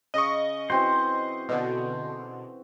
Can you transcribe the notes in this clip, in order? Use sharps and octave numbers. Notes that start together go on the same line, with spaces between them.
C#3 D#5 C#6
E3 C4 F#4 C5
B2 D3